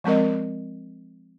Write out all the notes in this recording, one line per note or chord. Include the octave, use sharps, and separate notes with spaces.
F3 G#3 C4 A#4 D#5